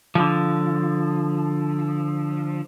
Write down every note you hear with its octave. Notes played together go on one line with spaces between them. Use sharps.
D3 F3